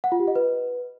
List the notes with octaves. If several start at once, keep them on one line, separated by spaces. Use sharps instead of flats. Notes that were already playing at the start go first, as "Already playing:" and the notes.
F#5
F4
G4
D#5
B4